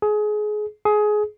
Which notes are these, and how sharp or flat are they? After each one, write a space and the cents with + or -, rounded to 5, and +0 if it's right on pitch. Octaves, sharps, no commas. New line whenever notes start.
G#4 +25
G#4 +20